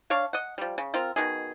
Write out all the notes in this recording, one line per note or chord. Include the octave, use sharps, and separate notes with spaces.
D4 C#5 F5
D#5 F#5
F3 G3
C#3
C4 F4 A#4
B2 D#3 G#4